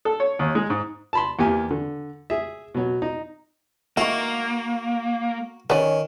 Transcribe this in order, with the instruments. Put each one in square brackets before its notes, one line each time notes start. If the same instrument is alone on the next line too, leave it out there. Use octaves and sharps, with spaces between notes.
[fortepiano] A4
C#5
D#2
G#3
G#2
A5 B5 C6
E2 A#3 G4 G#5
D3
G#4 E5
B2 F#3
D#4
[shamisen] D#3 E4 [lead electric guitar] A#3 [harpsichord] F#4
[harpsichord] D#3 [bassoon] C#4 [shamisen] B4 D5